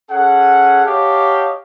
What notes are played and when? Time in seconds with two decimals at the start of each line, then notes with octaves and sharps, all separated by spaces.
0.11 C#4 G#4 A4 F#5
0.85 F#4 G4 C#5 D#5 F5 A5